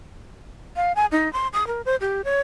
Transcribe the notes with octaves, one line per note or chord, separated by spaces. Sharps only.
F5
G#5
D#4
C6
D#6
A#4
C5
G4
C#5